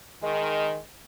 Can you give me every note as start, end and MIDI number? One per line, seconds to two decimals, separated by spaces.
0.23 0.75 51
0.23 0.79 56